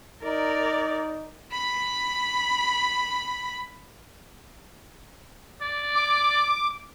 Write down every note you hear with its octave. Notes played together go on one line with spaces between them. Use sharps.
D#4 A#4 D5
B5 B6
D5
D6